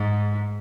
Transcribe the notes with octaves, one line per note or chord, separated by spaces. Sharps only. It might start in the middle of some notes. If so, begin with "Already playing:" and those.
Already playing: G#2